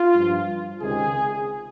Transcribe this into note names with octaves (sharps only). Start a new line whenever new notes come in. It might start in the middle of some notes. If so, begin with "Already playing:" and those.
Already playing: F4
G2 F3
C#2 C3 D#3 G#4